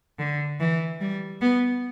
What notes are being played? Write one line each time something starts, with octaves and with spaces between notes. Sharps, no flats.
D3
E3
G3
B3